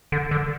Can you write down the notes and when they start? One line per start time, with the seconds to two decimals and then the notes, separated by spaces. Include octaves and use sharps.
0.12 D3
0.31 D3